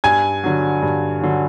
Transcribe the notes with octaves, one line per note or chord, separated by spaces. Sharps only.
G2 G#5 G#6
D3 F#3
G2
D3 F#3